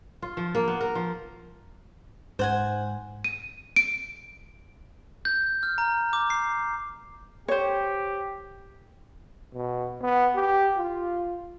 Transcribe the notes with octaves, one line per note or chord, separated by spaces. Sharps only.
F4
F3
A#3
B3
A#4
F3
G#2 C5 F#5 G#5
D#7
D7
G6
F6
A#5
D6
C7
G4 C5 C#5
B2
B3
G4
F4